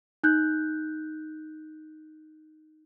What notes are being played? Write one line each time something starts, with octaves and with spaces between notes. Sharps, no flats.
D#4 F#6 G6